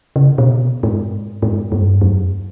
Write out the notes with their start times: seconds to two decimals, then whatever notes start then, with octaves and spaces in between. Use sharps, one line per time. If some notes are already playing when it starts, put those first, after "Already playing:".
0.16 C#3
0.38 B2
0.83 G#2
1.42 G#2
1.72 G2
2.01 F#2